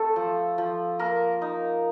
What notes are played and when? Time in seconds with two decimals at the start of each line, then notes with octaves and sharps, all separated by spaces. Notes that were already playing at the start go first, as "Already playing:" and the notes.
Already playing: A3 C4 A4
0.16 F3
0.58 F3
0.99 A#3 A#4
1.42 D#4